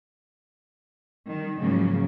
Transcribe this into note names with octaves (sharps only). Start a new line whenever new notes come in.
D#3 G3
G#2 C#3 F3 F#3 A3 A#3